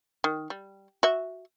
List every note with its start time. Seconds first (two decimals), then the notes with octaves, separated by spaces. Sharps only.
0.24 D#3
0.50 G3
1.03 F#4 E5